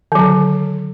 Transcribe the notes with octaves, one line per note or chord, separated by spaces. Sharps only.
D3 D#3 F#3